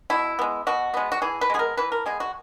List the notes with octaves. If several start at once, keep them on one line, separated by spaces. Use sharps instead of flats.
B2 E4
G#3 B3
B2 F#4
G#3 B3
F#4
E3 G#4
B4
G#3 B3 G#4
A#4
E3 B4
A#4
G#3 B3 G#4
F#4